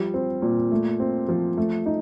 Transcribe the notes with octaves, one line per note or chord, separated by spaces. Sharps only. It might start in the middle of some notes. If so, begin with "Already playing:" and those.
Already playing: F3 G3
C4
A#2
A3
C4
F3
A3
D#4